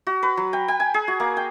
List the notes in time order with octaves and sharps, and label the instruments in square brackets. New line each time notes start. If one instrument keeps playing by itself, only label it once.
[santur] F#4
B4
F#3
G5
G5
G#5
G#4
F#4
A#3
G5